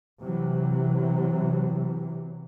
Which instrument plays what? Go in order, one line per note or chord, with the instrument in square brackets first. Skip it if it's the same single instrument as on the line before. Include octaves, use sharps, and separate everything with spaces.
[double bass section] C3 E3 F#3